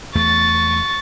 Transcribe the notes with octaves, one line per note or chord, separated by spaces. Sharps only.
E2 A3 C#6 A6